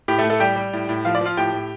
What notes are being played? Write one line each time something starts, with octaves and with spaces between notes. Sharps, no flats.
A2 G4
A3 A4
A2
A3 A4
G3 G4 G5
G3
A2
A2
F3 F5
D5
F3 F4 F5
A2 G4 G5
A2